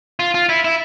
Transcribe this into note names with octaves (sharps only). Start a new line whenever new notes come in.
F4
F4
E4
E4